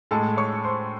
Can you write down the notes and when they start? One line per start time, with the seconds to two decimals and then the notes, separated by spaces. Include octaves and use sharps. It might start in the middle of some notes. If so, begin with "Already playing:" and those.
0.11 A2 G#3 A4 A5
0.37 C#5 C#6
0.64 C5 C6